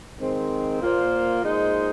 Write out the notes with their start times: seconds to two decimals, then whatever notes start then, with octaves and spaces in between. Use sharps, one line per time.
0.18 D#3 G#3 C4
0.81 A#2 A#3 F4 C5
1.43 A#2 G#3 D#4 C5